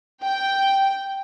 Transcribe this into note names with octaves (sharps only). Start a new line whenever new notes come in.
G5